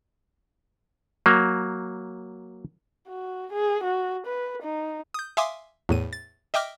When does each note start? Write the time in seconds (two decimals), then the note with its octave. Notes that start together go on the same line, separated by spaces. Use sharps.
1.26 F#3 A#3
3.08 F#4
3.52 G#4
3.83 F#4
4.26 B4
4.62 D#4
5.14 D#6 G6
5.37 E5 F5 G#5 C6 D6 D#6
5.89 E2 A2 D#7
6.13 A6
6.54 D#5 E5 G5 D6 F6